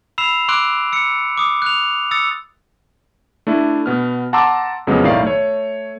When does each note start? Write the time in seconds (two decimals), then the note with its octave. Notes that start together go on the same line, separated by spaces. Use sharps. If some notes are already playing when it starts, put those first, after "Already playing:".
0.18 B5 E6 C7 E7 F7
0.48 C6 D6 E6 F#6 D7
0.93 E6 C#7
1.37 D6 D#6
1.62 F#6 F7
2.11 D#6 E6 A6 C#7
3.47 A3 D4 E4
3.86 B2 B3 F6
4.33 F#5 A5 A#5 C6 D6 E6
4.87 F2 C#3 F#3 G#3 B3
5.04 B1 A2 D#3 D5 F5 C7
5.22 A3 C#5